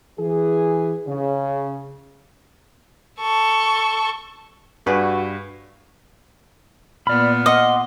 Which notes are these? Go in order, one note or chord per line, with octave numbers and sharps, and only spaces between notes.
E3 G#4
C#3
A4 C#6
G2 F#4 G#4 B4 D5
A#2 B3 D5 B5 F6
D#5 F#5 C6 D6